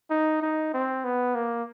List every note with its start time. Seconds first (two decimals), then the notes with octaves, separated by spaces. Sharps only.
0.10 D#4
0.42 D#4
0.74 C4
1.04 B3
1.35 A#3